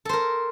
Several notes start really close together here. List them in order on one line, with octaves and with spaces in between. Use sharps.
A4 C5 A#4